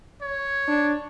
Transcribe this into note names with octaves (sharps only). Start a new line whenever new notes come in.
C#5
D4